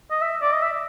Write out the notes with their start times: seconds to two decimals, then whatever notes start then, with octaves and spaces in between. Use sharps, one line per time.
0.11 D#5
0.22 E5
0.42 D5
0.52 D#5
0.62 E5